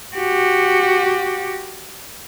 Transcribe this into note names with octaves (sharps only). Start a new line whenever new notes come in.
F#4 G4